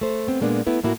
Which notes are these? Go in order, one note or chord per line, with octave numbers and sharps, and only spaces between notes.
A3 C5
B3 C4
A#2 G#3 A#3 B3 D4
A3 B3 E4 B4
A2 A#3 E4 F#4